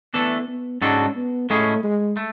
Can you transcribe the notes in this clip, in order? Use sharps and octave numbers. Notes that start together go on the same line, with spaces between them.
E3 A3 B3 D4 A4
B3
G#2 G#3 C#4 D4 F#4 A4
B3
A2 G#3 A3 C#4 G#4
G#3
A3